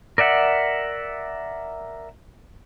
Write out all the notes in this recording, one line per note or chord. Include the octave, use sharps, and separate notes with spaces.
A#4 D5 E5 F#5